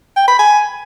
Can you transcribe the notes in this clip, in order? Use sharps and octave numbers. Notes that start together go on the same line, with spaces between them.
G5
B5
G#5